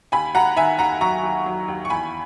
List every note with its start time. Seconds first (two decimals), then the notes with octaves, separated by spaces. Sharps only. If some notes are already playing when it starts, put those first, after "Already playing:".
0.12 D#2 G#5 B5
0.35 D#2 F#5 A#5
0.57 D#3 E5 G#5
0.79 D#2 F#5 A#5
1.01 F#3 A#5 C#6
1.23 D#2
1.46 F#3
1.68 D#2
1.85 C#6
1.90 E2 G#5 B5